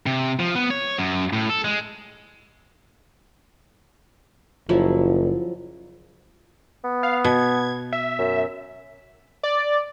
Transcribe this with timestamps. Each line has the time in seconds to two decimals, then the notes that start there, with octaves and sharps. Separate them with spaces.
0.06 C3
0.39 F3
0.55 B3
0.70 C#5
0.99 F#2
1.33 A2
1.50 A4
1.64 G#3
4.69 F#1 F3 F#3 E4
6.84 B3
7.03 F5
7.24 B2 G#6
7.93 E5
8.18 F#2
9.43 D5